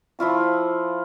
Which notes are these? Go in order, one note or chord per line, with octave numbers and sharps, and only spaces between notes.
F3 E4 F4 C#6